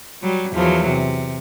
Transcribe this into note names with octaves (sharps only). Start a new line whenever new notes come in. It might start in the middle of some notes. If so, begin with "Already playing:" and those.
F#3 G3
E2 F3 F#3
C3